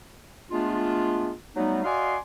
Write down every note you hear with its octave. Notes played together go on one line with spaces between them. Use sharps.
G#3 A3 B3 D4 F4
F#3 G3 A3 B3 D#4
F#4 D5 D#5 F5 G#5 C6